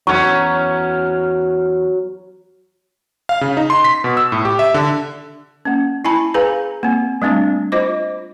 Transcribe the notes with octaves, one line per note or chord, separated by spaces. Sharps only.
E2 F#3 C#4 C#6
F5
C#3
D#4
C6
B6
B2
E6
A2
G4
E5
D3
A#3 C#4
E4 G#5 A5 B5
G#4 B4 F5 G#5 A#5
A#3 C4
G3 A3 C4 D4
F4 C5 D#5 D6